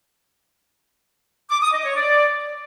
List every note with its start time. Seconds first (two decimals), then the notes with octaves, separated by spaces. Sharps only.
1.51 D6
1.62 D#6
1.73 D#5
1.85 C#5
1.96 D5